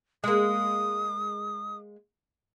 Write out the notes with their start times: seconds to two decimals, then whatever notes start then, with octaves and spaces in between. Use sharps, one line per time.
0.24 G#3 A#3 D#6